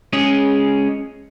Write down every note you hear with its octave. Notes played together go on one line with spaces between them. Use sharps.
G#3 C#4 G#4